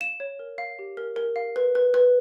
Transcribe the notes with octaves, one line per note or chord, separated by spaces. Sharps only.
F5 E7
C#5
A#4
F5
G4
A#4
A#4
F5
B4
B4
B4